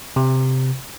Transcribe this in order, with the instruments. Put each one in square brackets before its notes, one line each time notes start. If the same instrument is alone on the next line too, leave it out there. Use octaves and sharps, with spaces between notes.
[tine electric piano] C3